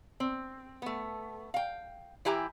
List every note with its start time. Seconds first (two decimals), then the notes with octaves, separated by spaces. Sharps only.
0.20 C4
0.82 A3 B3
1.54 F5 G5
2.25 E3 E4 G4 G#5 A#5